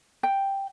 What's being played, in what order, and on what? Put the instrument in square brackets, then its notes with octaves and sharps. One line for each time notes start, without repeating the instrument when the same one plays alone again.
[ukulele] G5